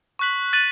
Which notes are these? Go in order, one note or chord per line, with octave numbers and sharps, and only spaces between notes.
C#6 F#6 B6 F#7
F#6 A6 D#7 F#7